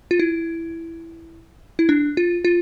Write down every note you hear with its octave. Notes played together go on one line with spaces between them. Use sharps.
F4
E4
E4
D4
F4
F4